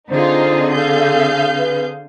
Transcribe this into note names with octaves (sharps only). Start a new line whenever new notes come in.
D3 C4 D#4 F4 G#4 C5
A4 F5 G6
B4